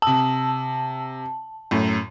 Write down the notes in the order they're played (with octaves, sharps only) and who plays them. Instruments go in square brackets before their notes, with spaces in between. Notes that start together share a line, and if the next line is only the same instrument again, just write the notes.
[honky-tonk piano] C3 E6 [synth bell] A5
[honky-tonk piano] F#2 A2